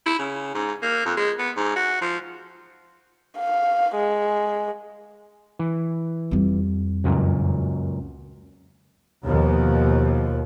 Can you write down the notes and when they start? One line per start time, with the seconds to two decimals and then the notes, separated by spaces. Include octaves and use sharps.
0.06 E4
0.19 C#3
0.54 G#2
0.82 A#3
1.05 F2
1.17 G#3
1.39 B3
1.56 G#2
1.76 F#4
2.02 F3
3.38 F5
3.96 G#3
5.59 E3
6.31 F2 G3
7.04 C#2 F#2 A#2
9.25 D#2 B2 F3